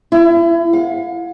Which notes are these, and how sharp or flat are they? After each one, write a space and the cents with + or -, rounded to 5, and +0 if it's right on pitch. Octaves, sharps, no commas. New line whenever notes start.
E4 +35
F5 +40